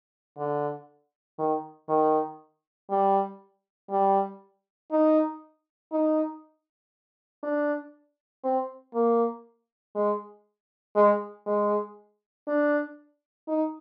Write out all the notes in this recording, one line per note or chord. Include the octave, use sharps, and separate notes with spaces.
D3
D#3
D#3
G3
G3
D#4
D#4
D4
C4
A#3
G#3
G#3
G#3
D4
D#4